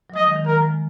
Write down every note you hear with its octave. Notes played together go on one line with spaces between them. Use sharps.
F#3
F3 G#3 D#5
D#3 F#3
D#3
D#3 F#3 A#4
F3 G#3